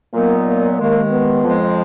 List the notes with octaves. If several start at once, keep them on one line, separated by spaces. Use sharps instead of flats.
A#2 F#3 A#3 B3 D#4
A#3
D#2 D#3 G#3 A#3
B3
F2 F3 G#3